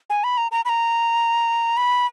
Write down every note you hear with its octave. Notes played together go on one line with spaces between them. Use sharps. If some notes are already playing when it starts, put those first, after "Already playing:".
G#5
B5
A#5
A#5
B5
A#5
B5